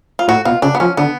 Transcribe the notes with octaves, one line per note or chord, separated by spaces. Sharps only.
F4
A2 F#4
B2 F4
C#3 D4
B3
F3 C#4
D3 B3